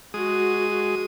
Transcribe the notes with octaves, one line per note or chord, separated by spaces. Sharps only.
G#3 F#4 D#6